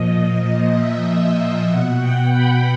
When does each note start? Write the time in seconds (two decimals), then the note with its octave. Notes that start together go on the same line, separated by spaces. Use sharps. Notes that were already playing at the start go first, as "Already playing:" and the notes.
Already playing: A#2 F3 D#5
0.78 E5
1.69 B2 F#5
1.99 G5
2.29 B5